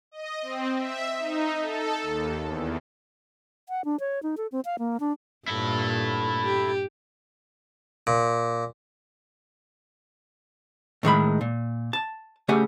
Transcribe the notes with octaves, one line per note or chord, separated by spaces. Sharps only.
D#5
C4
E5
D#4
A4
D#2
E2
F#5
D4
C#5
D#4
A4
C4
F5
A#3
D4
G2 A#2 E4 A4
G4
A#2
A2 D#3 G#3 B5
A#2
A5
C#3 A3 G4 F#5 G#5